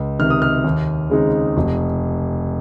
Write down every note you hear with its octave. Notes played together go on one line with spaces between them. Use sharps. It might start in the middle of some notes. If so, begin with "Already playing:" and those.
Already playing: C#2
C3 D#3 F6
D#6
F6
D#2
C#3 G#3 C4 D#4
F1